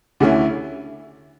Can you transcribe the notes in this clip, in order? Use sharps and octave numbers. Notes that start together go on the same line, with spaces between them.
D2 D3 A3 C#4 E4